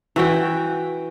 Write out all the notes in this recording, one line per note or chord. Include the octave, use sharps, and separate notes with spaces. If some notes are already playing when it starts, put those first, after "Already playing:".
E3 F#4 G5